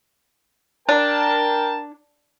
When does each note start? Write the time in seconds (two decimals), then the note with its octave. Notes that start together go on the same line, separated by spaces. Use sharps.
0.89 D4 A#4 G5 A5